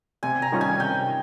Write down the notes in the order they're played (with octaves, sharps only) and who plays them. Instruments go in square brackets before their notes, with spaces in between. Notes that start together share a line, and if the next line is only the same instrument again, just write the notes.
[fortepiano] C3 [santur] G#5
[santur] A#5
[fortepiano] D#3 G3 C#4 F4
[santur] G#5
[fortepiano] C3 [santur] G5